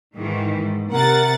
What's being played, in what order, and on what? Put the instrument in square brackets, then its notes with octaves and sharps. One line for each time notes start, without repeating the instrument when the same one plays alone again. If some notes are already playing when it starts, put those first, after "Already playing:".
[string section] G#2 D#3 E3
G#2
[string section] C3 F#5 A6 [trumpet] A#4